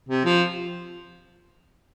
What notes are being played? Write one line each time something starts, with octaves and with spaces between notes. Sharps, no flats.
C3
F3